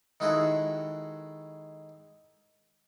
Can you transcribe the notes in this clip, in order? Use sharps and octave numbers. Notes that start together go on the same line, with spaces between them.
D#3 G#3 E4 F#4 G#4 A4